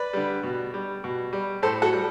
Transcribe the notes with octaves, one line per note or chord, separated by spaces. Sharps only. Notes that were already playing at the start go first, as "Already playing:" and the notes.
Already playing: B4 D5
D3 G3
B2
G3
B2
G3
A2 A4 C5
F#4 A4
G3